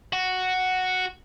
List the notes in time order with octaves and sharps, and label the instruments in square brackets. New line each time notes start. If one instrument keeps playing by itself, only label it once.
[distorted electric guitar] F#4